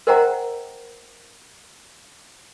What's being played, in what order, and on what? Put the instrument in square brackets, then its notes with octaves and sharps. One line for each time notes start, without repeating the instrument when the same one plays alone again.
[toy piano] A#4 C5 D#5 F#5 G5 A#5